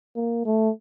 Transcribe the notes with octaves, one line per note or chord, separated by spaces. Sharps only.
A#3
A3